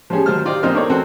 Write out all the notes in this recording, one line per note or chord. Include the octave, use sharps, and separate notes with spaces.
F3 G3 C#4 G#4
D#2 F#3 C5 A5 F6
D#4 F4 G4 C5 D5
F2 A#2 C4 D#4 C5 F6
C4 D4 D#4 A4 A#4 C#5
E2 C4 F#4 A4 F#5